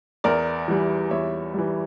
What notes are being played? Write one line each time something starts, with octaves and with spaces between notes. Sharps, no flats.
E2 A#4 D5
E3 G3
E2 C#5 E5
E3 G3